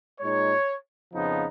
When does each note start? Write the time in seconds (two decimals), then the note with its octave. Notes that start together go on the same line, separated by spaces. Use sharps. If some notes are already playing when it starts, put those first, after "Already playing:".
0.21 A#2 G#3 D#4 C#5
1.14 F2 C#3 F3 B3 D#4